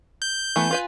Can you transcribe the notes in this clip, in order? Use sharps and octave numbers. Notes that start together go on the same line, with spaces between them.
G6
E3 A3 B3
F4 B4 G#5